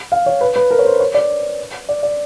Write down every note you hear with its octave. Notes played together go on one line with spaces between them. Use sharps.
F5
C#5
B4
B4
A#4
C#5
C5
C#5
D5
D5
D5